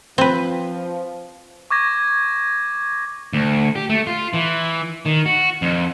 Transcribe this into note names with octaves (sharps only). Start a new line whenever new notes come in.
F3 C4 B4
C#6 D6 G#6 A#6
D2
G4
A3
F4
E3
D#3
F#4
F2